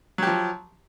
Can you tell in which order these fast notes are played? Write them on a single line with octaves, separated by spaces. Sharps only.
F#3 G4 F3